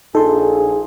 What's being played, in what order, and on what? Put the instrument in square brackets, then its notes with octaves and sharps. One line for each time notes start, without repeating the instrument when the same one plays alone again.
[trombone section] A#1 G#4 [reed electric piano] D#4 C6 [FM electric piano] A4